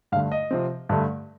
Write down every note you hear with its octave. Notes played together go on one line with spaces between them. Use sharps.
G2 D3 A3 F5
D#5
C3 F3 C4
G2 D3 A3